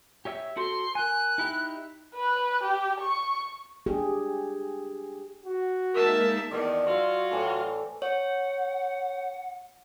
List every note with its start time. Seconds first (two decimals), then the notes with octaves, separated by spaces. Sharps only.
0.25 G4 C#5 E5
0.57 F#4 A4 C5 C6
0.95 A#4 G#5 F#6
1.38 D#4 E4 G4
2.15 B4
2.64 G4
3.00 C#6
3.86 D4 G4 G#4
5.46 F#4
5.94 G#3 A#3 D#4 A#4 E5 A5
6.51 E2 D#3 D5 A5
6.86 F#3 F4 F#4 C5 E5
7.31 A2 E3 A3
8.02 C#5 F#5